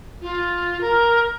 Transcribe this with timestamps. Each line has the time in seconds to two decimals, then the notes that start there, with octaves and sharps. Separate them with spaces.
0.21 F4
0.81 A#4